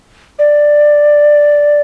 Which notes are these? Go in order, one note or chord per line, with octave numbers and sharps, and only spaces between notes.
D5